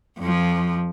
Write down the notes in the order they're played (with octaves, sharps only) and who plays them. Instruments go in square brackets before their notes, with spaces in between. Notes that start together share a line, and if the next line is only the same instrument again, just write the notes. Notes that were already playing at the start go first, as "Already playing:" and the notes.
[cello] F2 F3